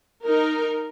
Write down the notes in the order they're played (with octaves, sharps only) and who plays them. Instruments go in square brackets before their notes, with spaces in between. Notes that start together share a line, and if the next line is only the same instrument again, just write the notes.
[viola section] D#4 A#4